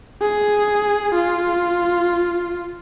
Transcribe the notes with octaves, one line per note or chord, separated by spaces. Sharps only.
G#4
F4